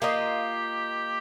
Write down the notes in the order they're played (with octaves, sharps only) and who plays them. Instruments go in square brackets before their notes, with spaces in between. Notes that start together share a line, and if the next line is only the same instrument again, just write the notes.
[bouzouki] A#3 F4 D#5 [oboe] G4